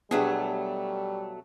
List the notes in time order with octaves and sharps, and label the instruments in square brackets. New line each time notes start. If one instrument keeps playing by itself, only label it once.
[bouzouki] B2 F#3 A3 [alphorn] G3 [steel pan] B3 D4 G4 [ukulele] G#4